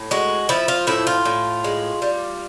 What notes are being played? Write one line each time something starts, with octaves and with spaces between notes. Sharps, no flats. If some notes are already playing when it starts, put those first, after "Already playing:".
Already playing: A2
G#3 F#4
F3 E4
F4
A2 E4
F4
A2
G#3
G3